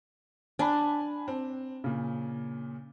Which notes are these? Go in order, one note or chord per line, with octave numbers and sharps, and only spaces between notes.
D4 G#5 B5
C4
A#2 C#3